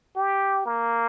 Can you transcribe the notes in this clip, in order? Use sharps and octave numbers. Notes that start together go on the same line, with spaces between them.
G4
A#3